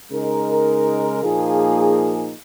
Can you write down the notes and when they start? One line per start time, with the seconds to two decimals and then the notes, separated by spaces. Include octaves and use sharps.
0.11 C#3 G#3 D#4 A#4
1.22 A#2 F3 A#3 D#4 G#4